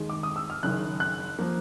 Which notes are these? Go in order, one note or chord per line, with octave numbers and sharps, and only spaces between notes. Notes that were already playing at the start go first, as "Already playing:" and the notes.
Already playing: D#2 D#3 G#3
D6
D#6
E6
F6
F#1 F#2 D#3 F#6
F#6
F3 A#3